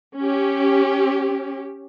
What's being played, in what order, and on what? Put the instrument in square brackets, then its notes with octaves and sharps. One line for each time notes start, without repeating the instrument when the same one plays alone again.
[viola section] C#4 G4